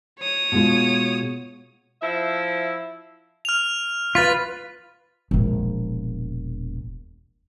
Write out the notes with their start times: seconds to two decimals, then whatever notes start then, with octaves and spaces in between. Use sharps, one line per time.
0.19 C#5 D#6
0.52 B2 G#3 F4
2.02 F3 E4 E5
3.45 F6 F7
4.15 F4 B4 A6 B6
5.31 E1 A#1